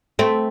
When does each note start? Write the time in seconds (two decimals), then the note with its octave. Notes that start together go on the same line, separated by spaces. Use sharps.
0.19 A3 C4